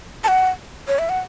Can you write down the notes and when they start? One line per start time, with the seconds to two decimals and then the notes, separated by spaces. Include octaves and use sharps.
0.24 A5
0.28 F#5
0.88 C#5
0.99 E5
1.09 F#5